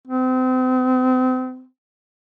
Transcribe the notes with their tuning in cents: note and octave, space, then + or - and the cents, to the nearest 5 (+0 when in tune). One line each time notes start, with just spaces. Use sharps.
C4 -35